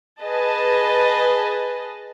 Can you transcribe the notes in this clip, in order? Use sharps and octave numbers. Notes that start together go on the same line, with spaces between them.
G#4 B4 D#5 A5